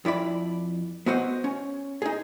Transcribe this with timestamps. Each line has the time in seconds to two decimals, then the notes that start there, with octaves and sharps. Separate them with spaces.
0.05 F2 E4 D5 B5
1.06 B3 C4 F#4 C5 D#5
1.44 C#4
2.02 D#4 G#4